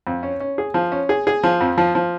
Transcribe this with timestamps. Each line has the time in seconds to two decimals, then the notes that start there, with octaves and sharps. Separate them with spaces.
0.07 F2
0.23 C#4
0.40 C#4
0.58 G#4
0.74 F3
0.92 C#4
1.09 G#4
1.27 G#4
1.43 F3
1.61 F2
1.78 F3
1.95 F3